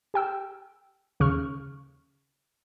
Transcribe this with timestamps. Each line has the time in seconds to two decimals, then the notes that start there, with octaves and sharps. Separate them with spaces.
0.14 G4 G5 E6
1.20 D#2 C#3 C#6 F6